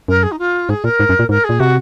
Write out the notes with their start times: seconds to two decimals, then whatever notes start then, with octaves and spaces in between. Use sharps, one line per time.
0.08 F#2 A#4
0.23 G#4
0.32 D#4
0.39 F4
0.69 G#2 G#4
0.84 A#2 A#4
1.00 G#2
1.09 F#2
1.19 A#2
1.29 G#2 A#4
1.44 G#4
1.49 A#2
1.60 C3 F#4